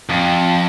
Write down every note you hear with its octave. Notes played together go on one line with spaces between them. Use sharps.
F2